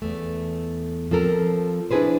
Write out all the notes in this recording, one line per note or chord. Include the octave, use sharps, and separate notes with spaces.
E2 A3
F3 C4 A4 A#4
D4 E4 F4 G#4 B4 C5